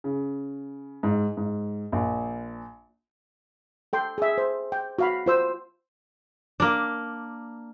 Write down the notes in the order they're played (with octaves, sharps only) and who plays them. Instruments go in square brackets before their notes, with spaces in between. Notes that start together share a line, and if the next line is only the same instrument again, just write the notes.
[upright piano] C#3
G#2
G#2
A#1
[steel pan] A4 G5 C6
G#4 E5
C5
G5
F#4 F5 B5
F4 C5 E6
[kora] A#3 D4